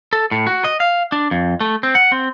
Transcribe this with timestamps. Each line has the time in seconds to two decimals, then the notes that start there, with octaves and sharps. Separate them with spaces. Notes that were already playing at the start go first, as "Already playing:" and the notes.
0.13 A4
0.31 A2
0.47 F#4
0.64 D#5
0.80 F5
1.12 D4
1.31 F2
1.60 A3
1.83 C4
1.95 F#5
2.12 C4